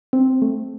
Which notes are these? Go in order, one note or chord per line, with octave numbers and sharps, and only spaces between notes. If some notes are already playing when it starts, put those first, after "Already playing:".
C4
A3